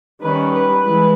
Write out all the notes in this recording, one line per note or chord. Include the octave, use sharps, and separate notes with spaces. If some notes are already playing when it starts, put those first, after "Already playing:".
D#3 G3 C#4 B4
B4
E3 G#3